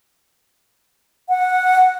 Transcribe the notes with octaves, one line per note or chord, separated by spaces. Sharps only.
F#5